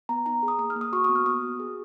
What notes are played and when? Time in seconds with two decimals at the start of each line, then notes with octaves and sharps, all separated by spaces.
0.09 B3 A#5
0.26 D#4 A#5
0.43 G#4
0.48 D#6
0.59 A#3 D#6
0.70 F6
0.76 A#3
0.81 D#6
0.93 F#4 C#6
1.04 D#6
1.09 B3
1.15 F6
1.26 B3 D#6
1.43 F#4
1.60 G#4